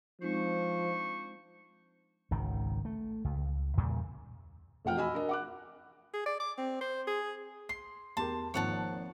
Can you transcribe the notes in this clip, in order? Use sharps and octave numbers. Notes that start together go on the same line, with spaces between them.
F3 G#3 C4 D4 D#4 C5 C#6
G#1 C#2 D#3
A3
C#2
E2 A#2 C#3 G3
F1 E2 F3 F#5 G5 F6
F#4 D#5 G#5 B5 E6
D4 A#4 D#5
F#5 D6 F#6
G#4
D5
D6
C4
C5
G#4
C6 C7
E2 G4 A#4 A5 C6
G#1 D#3 F3 A#3 C#5 F#5 A5